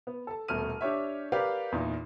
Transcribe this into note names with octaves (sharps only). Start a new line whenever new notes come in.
B3
A4 A5
D#1 B2 A3 F6 D#7
D4 G4 C#5 E5
G4 A#4 B4 D5 F5 F#5
E2 A#2 D#4